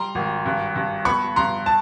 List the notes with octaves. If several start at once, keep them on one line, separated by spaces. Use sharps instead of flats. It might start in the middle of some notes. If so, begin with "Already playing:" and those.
Already playing: G3 A#5 C6
G#1
G2
G2
B3 B5 C#6
G2 A#5 C6
A5